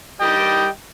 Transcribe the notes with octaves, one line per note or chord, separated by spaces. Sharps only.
G3 D#5 G5